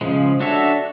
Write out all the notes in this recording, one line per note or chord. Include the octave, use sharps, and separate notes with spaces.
C#3 F3 G#3
D4 F#4 A4 C#5 E5